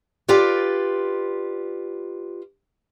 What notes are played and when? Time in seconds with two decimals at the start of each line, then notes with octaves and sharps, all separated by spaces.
0.28 F4 G4 B4 D5